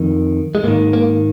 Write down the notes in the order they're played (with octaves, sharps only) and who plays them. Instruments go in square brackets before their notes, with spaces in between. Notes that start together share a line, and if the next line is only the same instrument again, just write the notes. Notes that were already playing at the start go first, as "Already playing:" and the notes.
Already playing: [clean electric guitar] F2 D#3
G#3
G#2 A#3
D#3
A#3